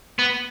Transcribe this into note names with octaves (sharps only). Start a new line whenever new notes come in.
B3